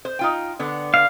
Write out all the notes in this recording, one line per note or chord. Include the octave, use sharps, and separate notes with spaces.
C5
D#4 F4 G5
D3 B3
F5